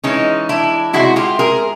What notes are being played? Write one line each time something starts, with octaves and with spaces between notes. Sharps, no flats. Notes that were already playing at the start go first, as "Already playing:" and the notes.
E3 G#3 C#4 D#4
D4 E4
E3 G#3 E4 F#4
C3
F4 G4
G#4 A#4